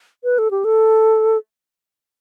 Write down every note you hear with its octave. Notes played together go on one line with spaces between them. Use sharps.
B4
A4
G4
A4